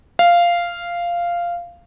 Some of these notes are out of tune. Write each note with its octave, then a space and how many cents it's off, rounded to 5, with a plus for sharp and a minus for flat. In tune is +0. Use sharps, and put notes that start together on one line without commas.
F5 -10